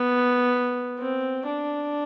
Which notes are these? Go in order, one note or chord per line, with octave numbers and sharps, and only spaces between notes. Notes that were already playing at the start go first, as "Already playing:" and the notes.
Already playing: B3
C4
D4